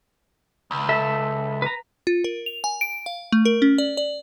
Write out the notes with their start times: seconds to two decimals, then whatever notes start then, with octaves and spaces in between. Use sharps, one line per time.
0.71 C#2
0.89 A4 E5
1.62 B4 A#5
2.07 F4
2.24 A#4
2.46 F7
2.64 G#5
2.81 D7
3.06 F5
3.32 A3
3.45 A#4
3.62 C#4
3.78 D5
3.97 D5